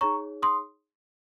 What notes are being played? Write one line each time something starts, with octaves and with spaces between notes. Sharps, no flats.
D#4 G#4 C#5 A#5 C#6
C6 D#6